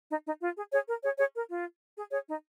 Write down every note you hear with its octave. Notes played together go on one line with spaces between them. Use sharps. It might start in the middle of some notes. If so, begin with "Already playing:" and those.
D#4
D#4
F4
G#4
G#4 C#5
A#4
G#4 C#5
G#4 C#5
A#4
F4
G#4
G#4 C#5
D#4